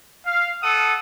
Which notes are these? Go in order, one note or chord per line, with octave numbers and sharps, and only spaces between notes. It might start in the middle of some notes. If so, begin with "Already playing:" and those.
F5
A4 F#5 D#6